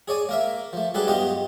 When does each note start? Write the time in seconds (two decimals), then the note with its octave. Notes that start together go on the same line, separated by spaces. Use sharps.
0.08 G#4 C#5 D5 G#5
0.29 A#3 A#4 E5
0.73 F3 A3
0.94 F#3 G3 D4 G#4 A4 B4
1.08 G2 B3 F4 G4 D#5